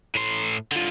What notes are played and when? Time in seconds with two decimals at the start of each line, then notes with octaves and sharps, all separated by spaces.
0.15 A2 C6
0.72 D3 F4